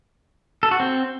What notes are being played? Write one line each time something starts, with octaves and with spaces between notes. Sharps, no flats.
A4
F#4
C4